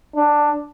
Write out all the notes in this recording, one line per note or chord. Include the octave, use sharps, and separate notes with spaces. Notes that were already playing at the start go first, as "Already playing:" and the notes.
D4